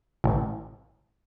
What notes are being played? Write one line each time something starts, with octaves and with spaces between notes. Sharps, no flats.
A1